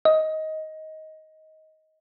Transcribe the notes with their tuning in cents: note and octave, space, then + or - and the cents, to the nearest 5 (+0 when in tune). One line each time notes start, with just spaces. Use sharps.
D#5 +15